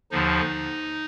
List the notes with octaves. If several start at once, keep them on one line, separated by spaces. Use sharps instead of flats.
D#2 D3 F3 D#4